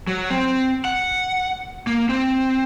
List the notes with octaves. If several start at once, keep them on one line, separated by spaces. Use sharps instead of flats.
F#3
C4
F#5
A#3
C4